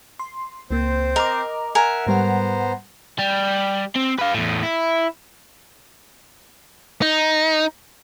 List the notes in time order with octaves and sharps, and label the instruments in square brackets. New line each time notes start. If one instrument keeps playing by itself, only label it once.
[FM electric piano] C6
[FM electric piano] C#2 A#3 [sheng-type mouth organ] C4 C5
[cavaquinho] A#4 [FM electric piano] D#5 A#5 D6
[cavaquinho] A#4 G#5 [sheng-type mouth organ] E5 F#5
[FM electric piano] G#2 G3 F#5 [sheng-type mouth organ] B3 C5 A#5
[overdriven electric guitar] G3
C4
B4 F5
E2 A2
E4
[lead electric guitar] D#4